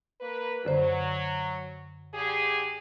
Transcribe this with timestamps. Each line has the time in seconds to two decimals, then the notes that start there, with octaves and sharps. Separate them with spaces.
0.21 A#3 B4
0.65 F#2 D3 F#3 C5
2.13 D3 G4 G#4